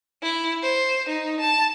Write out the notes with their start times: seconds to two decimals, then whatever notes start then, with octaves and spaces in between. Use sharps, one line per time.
0.22 E4
0.63 C5
1.09 D#4
1.40 A5